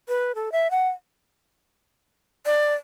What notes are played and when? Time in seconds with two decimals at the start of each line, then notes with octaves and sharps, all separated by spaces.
0.09 B4
0.35 A4
0.52 E5
0.71 F#5
2.46 D5